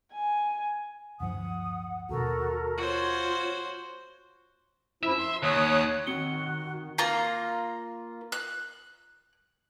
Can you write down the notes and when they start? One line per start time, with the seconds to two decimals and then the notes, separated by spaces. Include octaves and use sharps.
0.13 G#5
1.20 D1 G2 F3 F#5 D#6
2.09 D#2 B2 F#4 A4 A#4 A#5
2.78 F4 F#4 C5 C#5
5.03 F#2 F3 E4 E5
5.18 C6
5.43 D#2 C#5 D#6 F#6
6.07 D#3 C4 F#4 C#7 G7
6.98 A#3 F4 A#5
8.32 F#6